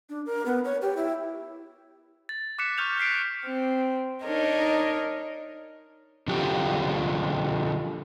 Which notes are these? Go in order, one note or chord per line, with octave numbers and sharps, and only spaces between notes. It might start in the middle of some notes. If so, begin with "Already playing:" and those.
D4
A#4
B3
C#5
G4
E4
A6
D6 F#6 B6 C#7 E7
C#6 D6 F6 G6 F7
F6 A6 B6 C7 D7
C4
D4 D#4 A#4 C#5 D#5
D3 F3 G4